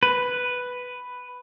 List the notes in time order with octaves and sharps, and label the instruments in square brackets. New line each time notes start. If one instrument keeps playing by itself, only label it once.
[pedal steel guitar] B4